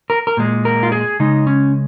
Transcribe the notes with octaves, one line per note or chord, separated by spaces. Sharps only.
A#4
A#4
A#2 G#3
A#4
F4
G#4
C#3 G#3 D#4
C#4